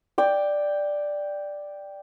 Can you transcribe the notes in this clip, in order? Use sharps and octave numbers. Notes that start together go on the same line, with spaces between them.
D5 G5